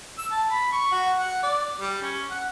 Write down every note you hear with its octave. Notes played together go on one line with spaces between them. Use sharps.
E6
A5
B5
C#6
F#4
F#5
D5
G3
C#4
F#5